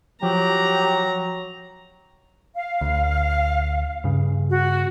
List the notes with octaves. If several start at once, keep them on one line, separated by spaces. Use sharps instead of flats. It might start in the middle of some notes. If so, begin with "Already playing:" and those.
F3 F#3 G4 A#5
F5
D2
G2 C#3
F#4